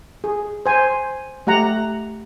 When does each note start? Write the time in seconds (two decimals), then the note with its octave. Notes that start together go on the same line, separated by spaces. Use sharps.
0.24 G#4
0.66 C5 G#5
1.47 A3 G4 F#5 A#5